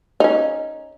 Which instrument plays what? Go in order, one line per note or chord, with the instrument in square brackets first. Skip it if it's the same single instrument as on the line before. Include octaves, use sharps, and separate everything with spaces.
[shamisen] C#4 D#4